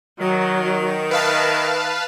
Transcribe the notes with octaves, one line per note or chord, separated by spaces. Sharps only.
D#3 F#3
B4 E5 F5 A5